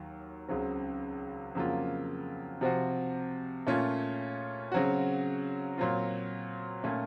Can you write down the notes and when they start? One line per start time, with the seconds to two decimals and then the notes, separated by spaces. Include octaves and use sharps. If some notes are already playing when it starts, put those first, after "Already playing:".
Already playing: D#2 F#3
0.48 C#2 C#3 F#3 C4
1.55 F2 C#3 F#3 A#3 F4
2.61 C3 F3 C4 F#4
3.67 A#2 A3 C#4 F4
4.72 C#3 F#3 C4 F#4
5.78 A#2 F#3 C4 F4
6.84 A#2 A3 C#4